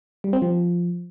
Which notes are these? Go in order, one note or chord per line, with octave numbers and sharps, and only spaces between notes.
G3
C4
F3